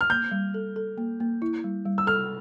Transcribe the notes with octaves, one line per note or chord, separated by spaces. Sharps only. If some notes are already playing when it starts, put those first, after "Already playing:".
F6
A#3 G6
G3
A4
A4
A#3
A#3
E4
G3
G3
E6
A4 F6